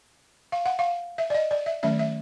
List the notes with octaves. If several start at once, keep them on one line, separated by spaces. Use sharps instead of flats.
F5
F#5
F5
E5
D5
D#5
D5
E5
D#3 F#3 A3 C#4 E5
E5